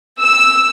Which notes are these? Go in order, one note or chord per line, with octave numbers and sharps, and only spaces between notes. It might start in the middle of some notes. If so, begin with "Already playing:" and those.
E6